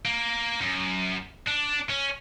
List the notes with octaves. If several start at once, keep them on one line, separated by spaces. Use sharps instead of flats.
A#3
F#2
D4
C#4